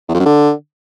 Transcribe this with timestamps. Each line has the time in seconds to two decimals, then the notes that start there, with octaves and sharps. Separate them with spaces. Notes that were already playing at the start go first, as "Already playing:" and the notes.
0.09 E2
0.14 F2
0.20 F#2
0.26 D3